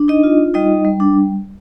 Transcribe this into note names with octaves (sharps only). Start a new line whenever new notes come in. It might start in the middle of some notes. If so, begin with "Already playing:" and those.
Already playing: D4
D#4 D#5
F4
G3 D#4 D#5
G3
D4